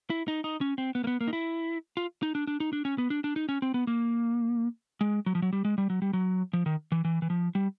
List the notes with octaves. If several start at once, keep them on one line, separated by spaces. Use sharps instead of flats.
E4
D#4
D#4
C#4
C4
B3
A#3
B3
A#3
D#4
E4
F4
D#4
D4
D4
D#4
D4
C#4
B3
D4
D4
D#4
C#4
C4
B3
A#3
G#3
F#3
F3
F#3
G3
G#3
G3
F#3
G3
F#3
F3
D#3
E3
E3
E3
F3
G3